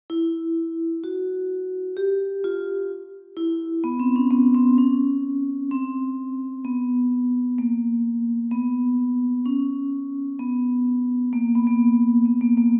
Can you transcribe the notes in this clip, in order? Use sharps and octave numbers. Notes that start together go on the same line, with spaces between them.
E4
F#4
G4
F4
E4
B3
C4
C#4
B3
C4
C#4
C4
B3
A#3
B3
C#4
B3
A#3
B3
A#3
B3
A#3
A#3